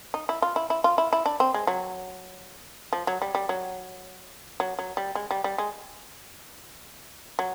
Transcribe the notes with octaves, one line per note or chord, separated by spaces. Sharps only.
D#4
E4
F4
E4
E4
F4
E4
E4
D4
C4
G#3
F#3
F3
F#3
G3
G3
F#3
F#3
F#3
G3
G#3
G3
G3
G#3
F#3